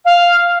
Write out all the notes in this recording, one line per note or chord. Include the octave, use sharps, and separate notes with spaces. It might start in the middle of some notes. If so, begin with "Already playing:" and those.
F5